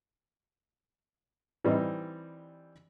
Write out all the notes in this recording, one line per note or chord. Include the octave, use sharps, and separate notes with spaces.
E3 G3 C4 D#4